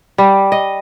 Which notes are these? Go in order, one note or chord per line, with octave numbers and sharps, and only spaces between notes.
G3
D#5